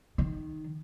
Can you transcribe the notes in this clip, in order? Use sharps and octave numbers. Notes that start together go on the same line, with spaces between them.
D#3